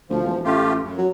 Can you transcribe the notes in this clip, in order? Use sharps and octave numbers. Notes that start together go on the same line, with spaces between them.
D2 F3
E1
A1 A3 F4 G4
F#2
F#3